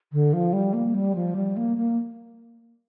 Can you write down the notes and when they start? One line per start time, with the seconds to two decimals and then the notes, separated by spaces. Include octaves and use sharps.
0.13 D3
0.33 F3
0.53 G3
0.73 A#3
0.94 G3
1.15 F3
1.36 G3
1.57 A#3
1.77 A#3